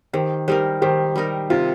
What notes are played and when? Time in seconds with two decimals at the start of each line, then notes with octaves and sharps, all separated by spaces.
0.13 D#3 G4 C5
0.48 G3 D#4 G4 A#4 C5
0.82 D#3 G4 C5
1.16 G3 D#4 A#4
1.50 C3 F4